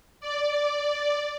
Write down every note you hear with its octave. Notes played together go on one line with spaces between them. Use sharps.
D5